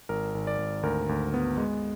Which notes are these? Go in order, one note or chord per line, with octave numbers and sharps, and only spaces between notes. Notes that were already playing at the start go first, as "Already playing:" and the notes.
G#1 A#4
G#1
D5
G#1
D2 A#4
D2
B3
G#3